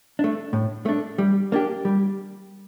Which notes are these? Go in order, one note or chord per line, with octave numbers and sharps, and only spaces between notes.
A3 D4
A2
A3 D4
G3
A#3 D4 G4
G3